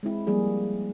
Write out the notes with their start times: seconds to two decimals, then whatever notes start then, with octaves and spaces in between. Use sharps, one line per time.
0.03 G#3 C4 E4
0.27 F3 G3 A#3 G#4